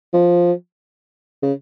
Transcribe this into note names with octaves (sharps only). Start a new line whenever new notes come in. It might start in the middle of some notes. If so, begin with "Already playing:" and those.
F3
C#3